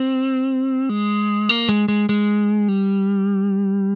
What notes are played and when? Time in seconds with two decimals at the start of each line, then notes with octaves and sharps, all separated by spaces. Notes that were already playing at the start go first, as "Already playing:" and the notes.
Already playing: C4
0.89 G#3
1.49 A#3
1.69 G#3
1.88 G#3
2.09 G#3
2.68 G3